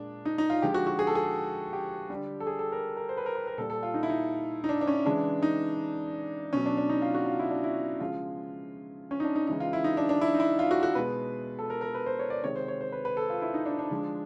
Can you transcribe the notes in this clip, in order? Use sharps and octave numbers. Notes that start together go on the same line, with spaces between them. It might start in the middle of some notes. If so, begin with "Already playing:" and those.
Already playing: A#2 G#3 D4
D#4
D#4
F4
D3 F3 G#3 G4
F#4
F#4
G#4
A4
G#4
G4
D3 G3
A4
G#4
A4
A#4
A#4
C5
B4
A#4
B4
A#4
A#2 G3 A4
A4
F4
D#4
E4
D#4
D#4
D4
D4
C#4
C#3 E3 G#3 D4
D#4
B2 F#3 C#4
D4
D4
D#4
F4
F#4
F4
E4
D4
E4
C#3 F3 G#3 F4
C#4
D#4
D4
D#4
C#3 E3 G#3 D#4
F4
E4
D#4
D4
D4
E4
D#4
E4
F4
F#4
F#4
B2 G#3 B4
A4
A#4
A#4
B4
C5
C#5
D5
C3 D#3 G#3 C#5
C5
C#5
C5
B4
B4
A4
F4
E4
D#4
D4
D4
D3 F3 G#3